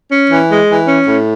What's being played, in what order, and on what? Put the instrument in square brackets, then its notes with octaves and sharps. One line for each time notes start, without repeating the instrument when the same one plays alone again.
[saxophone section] C#4
E3
G#3
E3
C#4
A2